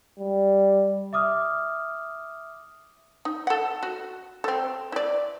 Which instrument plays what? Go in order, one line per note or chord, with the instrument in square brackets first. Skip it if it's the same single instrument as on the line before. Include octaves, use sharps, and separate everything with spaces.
[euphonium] G3
[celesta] E5 D6 D#6 F6
[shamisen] D#4
A4 F#5
F#4
C4 A4
E4 D5